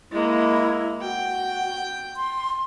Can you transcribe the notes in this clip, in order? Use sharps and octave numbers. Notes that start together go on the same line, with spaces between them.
G#3 A#3 E4
F#4 G5
C6